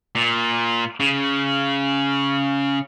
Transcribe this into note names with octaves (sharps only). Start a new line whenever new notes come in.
A#2
C#3